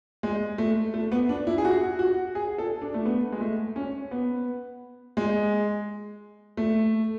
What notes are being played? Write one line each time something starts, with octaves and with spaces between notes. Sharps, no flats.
G#3
A3
A3
B3
D4
E4
G#4
F#4
F#4
G#4
A4
D4
A3
B3
G#3
A3
C#4
B3
G#3
A3